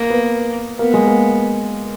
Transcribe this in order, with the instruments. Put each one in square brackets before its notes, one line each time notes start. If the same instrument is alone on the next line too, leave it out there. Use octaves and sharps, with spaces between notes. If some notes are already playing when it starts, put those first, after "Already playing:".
Already playing: [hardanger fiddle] A#3
[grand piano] B3
[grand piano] A#3 [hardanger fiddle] B3
[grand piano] G#3
A#3